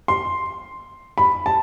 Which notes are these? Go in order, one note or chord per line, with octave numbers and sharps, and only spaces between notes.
C6
B5
A5